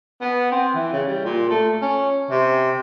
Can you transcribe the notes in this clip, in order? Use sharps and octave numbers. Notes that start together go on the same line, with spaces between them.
B3
C4
E3
C#3
G3
A#2
A3
C#4
C3